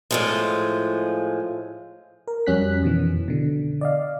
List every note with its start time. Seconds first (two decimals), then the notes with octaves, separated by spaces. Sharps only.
0.11 A2 F3 G#3
2.28 A#4
2.46 F2 G3 C#4 F#4 F#6 B6
2.83 F2 B2 D#3 E3
3.28 B2 D3
3.81 D5 D#5 F5